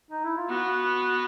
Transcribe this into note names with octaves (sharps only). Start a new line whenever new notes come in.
D#4
E4
F4
B3 F#4